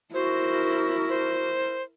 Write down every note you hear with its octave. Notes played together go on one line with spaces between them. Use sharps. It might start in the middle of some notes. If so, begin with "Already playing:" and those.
E4 F#4 A#4 C5
C5